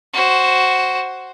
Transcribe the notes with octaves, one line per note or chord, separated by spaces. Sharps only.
F#4 C5